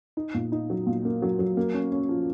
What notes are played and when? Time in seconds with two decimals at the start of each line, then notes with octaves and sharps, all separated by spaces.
0.17 D#4
0.34 A#2
0.52 D#4
0.70 F#3
0.87 A#2
1.05 A#3
1.22 F#3
1.39 F#3
1.57 A#3
1.74 C#4
1.92 C#4
2.09 F3